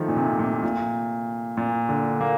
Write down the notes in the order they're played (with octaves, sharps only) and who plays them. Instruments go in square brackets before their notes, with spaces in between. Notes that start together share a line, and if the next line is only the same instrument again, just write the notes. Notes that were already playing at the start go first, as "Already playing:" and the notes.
Already playing: [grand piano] D#3 F3 A3
A#2
C3
A#2
A#2
A#2
D3
A#3